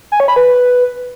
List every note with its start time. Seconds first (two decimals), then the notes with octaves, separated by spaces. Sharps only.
0.12 G#5
0.20 C#5
0.28 B5
0.36 B4